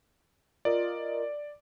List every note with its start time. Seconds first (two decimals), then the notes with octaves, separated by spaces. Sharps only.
0.65 F4 A#4 D5 D#5